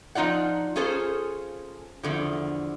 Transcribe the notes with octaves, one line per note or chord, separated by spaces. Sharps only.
F3 D#4 F4 D5 F#5
C#4 F4 G#4 A4 C5
E2 D3 F3